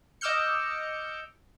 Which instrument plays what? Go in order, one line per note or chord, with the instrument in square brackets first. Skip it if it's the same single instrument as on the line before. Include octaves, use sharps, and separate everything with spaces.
[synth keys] D#5 D6 E6 F6 G6 C#7